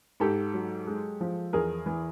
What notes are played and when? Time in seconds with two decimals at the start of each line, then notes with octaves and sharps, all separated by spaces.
0.20 G#2 G4 A4
0.54 F#3
0.87 G#3
1.21 F3
1.53 E2 G#4 A#4
1.86 E3